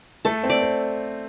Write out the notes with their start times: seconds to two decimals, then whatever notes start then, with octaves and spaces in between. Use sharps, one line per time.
0.25 A3 A4
0.43 C4
0.50 D5
0.62 C4